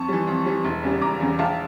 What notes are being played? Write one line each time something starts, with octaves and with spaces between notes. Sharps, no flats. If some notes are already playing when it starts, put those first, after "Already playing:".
Already playing: F2 A5 C#6
E3 G3
F2
E3 G3
E1
E2 C#3 G3
E1 A#5 D6
E2 C#3 G3
A#1 F5 A5